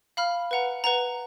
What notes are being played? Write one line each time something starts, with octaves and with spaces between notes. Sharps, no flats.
F5 B5 F6
B4 F#5 A#5
B4 F#5 A#5